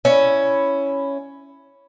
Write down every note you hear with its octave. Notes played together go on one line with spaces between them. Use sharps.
C#4 E4